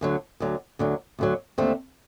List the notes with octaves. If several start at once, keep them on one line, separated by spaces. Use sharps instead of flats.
D2 D3 F#3
D2 D3 F#3
D2 D3 F#3
D2 D3 F#3
D#2 D3 A3 C4